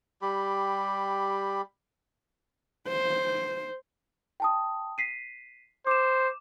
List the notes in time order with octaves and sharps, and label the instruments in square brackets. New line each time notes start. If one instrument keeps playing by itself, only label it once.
[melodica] G3 G4 B5
[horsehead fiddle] C5
[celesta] G5 A5 D#6
B6 C7 D#7
[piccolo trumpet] C5 [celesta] D6 E7